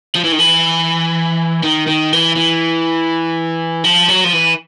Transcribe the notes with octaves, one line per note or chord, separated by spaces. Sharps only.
F3
E3
D#3
E3
D#3
D#3
E3
E3
F3
F#3
F3
E3